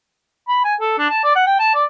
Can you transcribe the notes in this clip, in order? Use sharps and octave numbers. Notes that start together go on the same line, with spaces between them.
B5
G#5
A4
D4
A5
D5
F#5
G5
A5
D5